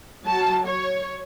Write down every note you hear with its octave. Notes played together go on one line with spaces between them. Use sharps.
F#3 A5
C#5